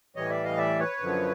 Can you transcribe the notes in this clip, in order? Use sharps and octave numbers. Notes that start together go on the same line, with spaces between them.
A2 E3 G3 C#5 D#5
D5 E5
D#5 F5
D5 E5
B4 C#5
F#2 D3 F3